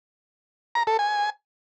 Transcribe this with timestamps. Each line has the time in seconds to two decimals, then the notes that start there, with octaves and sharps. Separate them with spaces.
0.75 A#5
0.87 A4
0.99 G#5